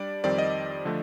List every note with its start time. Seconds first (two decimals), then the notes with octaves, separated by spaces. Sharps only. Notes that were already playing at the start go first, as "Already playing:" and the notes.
Already playing: G3 D4 D5
0.24 F2 D#3 G3 C4 D5
0.38 D#5
0.85 D3 F3 A3 D4